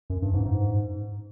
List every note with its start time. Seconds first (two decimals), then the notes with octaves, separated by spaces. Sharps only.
0.10 F#2
0.22 G2
0.34 G#2
0.45 G#2